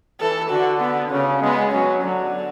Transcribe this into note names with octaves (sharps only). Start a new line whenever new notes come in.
E3 A4
D3 F#4
B3
C#3 C#4
G#3 B3
F#3 C#4
D3 F#3